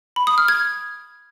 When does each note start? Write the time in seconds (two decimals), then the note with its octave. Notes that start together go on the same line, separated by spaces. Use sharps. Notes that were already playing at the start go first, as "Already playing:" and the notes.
0.16 B5
0.27 D#6
0.38 F6
0.48 G#6